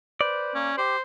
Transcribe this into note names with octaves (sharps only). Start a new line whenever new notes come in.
B4 C5 D5
A#3 C#4
G4 C5